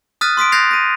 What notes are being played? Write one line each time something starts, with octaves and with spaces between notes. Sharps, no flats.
D#6 F6 F#6 A6 B6 D#7
C6 D#6 B6 D7
F#6 G6 A6 A#6 C7 F7
A#6 D#7